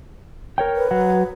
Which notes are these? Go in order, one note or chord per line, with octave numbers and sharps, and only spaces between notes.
A#4 C#5 G5
B4
F#3 F#5